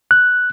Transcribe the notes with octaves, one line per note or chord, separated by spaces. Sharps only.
F#6